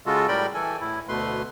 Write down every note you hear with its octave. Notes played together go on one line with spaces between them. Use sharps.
C#3 G#3 F4 F#4 A4
A2 G3 A#4 D5 G5 B5
E3 A4 G#5
A2 E4
D2 B2 A3 B4 C6